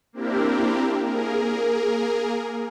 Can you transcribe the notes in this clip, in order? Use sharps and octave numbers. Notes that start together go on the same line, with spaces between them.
A#3 C4 D4 E4 G4 A#4
A#3 G#4 A#4